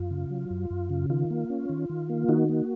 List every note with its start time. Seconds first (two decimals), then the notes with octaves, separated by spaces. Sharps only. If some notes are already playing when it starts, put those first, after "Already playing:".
Already playing: F#2 F4
0.11 C#3
0.30 F#3
0.50 F#2
0.70 F#2
0.90 C#3
1.10 D#3 F4
1.31 A#3
1.50 C#4
1.69 D#3
1.90 D#3
2.09 A#3
2.29 D#3 D#4 F#4
2.49 A#3